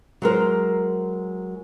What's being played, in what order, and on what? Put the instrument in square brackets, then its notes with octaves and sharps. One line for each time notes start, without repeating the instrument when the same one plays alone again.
[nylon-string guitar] F#3 G#3 A#4 C5